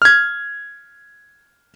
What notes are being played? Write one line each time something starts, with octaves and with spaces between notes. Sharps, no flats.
F6 G#6